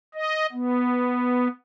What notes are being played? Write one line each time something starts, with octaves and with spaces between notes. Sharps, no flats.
D#5
B3